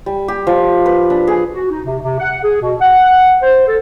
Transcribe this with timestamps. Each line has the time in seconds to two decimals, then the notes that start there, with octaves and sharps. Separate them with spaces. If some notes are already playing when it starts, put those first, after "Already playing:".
0.06 G3
0.28 G4
0.47 F3
0.86 B4
1.10 D4
1.27 G#4
1.52 F#4
1.70 D#4
1.84 C3
2.02 C3
2.20 F#5
2.43 G#4
2.62 B2
2.81 F#5
3.42 C5
3.67 A4